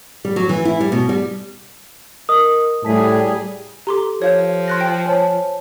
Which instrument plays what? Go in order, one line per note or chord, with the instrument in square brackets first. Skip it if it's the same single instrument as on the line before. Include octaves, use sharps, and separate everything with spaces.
[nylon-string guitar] G3
F#3
E3
E4
G3
B2
G3
[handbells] A#4 D#5 [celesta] D#6
[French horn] A2 [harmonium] G3 G#4 [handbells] A5 B6
[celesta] G4 A4 [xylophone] A#5 C6 D6
[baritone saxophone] F3 [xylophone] C#5 F5 G6
[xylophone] C6 F#6 A#6
G5
[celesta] C5 C#5 A5 [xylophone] G#5